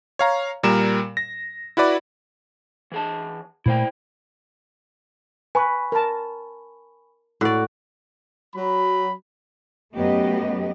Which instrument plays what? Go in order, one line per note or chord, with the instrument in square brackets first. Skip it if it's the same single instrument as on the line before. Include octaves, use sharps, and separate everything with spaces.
[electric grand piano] C#5 F5 A#5
A#2 G3 A#4 E7
A#6
E4 F#4 B4 D5 B5
[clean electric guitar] E3 G#4 A5
[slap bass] A#2 A3 A#3 [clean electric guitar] E4 C5 G5
[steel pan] B4 [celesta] G#5 B5 C#6
[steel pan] A#4 A5
[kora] A2 D5 [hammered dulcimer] F#4
[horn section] F#3 B5
[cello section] F#2 F#3 A3 B3 G4 D#5